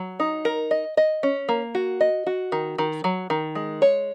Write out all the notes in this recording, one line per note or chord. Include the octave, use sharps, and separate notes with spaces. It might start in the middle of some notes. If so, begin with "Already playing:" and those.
Already playing: F#3
D#4
A#4
D#5
D#5
C#4
A#3
F#4
D#5
F#4
D#3
D#3
F#3
D#3
G#3
C#5